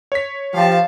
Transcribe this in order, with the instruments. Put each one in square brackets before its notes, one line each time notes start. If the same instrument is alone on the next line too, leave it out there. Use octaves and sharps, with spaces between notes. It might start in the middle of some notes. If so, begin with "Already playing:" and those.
[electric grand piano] C#5 B6
[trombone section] F3 G4 [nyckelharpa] F5 A5